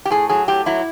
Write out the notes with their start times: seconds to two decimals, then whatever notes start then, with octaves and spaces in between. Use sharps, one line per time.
0.05 G4
0.10 A2 G#4
0.29 F#3 G#4
0.48 A2 G4
0.66 F#3 E4